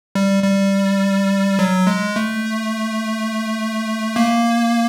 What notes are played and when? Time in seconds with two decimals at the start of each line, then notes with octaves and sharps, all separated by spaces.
0.15 G3
0.43 G3
1.59 F#3
1.87 G#3
2.16 A3
4.16 A#3